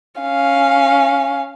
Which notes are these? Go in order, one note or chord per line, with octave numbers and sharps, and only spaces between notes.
C#4 F5